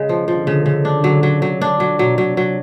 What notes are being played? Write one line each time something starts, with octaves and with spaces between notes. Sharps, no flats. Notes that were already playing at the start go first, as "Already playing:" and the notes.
Already playing: C#3 G#3
F3
D3 F3
C#3
C#3
D4
F#3
F#3
F#3
D4
F#3
B2 F#3
F#3
C3
F#3